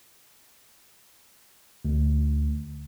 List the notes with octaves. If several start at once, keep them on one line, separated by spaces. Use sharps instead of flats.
D2